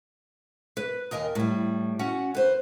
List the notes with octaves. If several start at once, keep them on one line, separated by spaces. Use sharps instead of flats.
B4
D#2 A#4 D#5 G#5
A2 G3
C#4 F#4 F#5
B4 C5